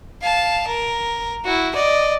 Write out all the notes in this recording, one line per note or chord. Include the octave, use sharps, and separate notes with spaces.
F5 A5
A#4
E4 F#4
D5 D#5